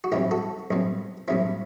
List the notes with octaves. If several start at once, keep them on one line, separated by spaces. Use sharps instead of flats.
F#4
A1 G2 F#3 C4 E4 G4
F#4 A4
A1 G2 F#3 C4
A1 G2 F#3 C4 E4